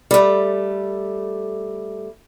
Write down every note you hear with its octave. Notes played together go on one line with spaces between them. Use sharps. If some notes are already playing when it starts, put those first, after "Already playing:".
G3 A3